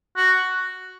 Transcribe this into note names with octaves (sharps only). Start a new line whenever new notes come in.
F#4